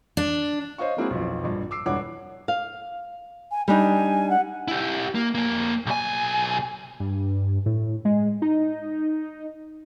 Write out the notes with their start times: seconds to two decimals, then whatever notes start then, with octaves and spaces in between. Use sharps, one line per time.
0.17 D4
0.78 C5 C#5 D#5 F5 C#6
0.97 G#3 A#3 C4 E4 F#4 G#4
1.10 B1 F2
1.43 A#1 G2
1.71 D6 E6 C7
1.86 E1 G2 E4 C#5 F#5 D6
2.48 F5
3.51 G#5
3.68 G3 D4 D#4 G#5
4.29 F#5
4.68 E4 G4
5.15 A#3
5.35 F2 A#3
5.86 B1 G#5
7.00 G2
7.66 A2
8.05 G#3
8.42 D#4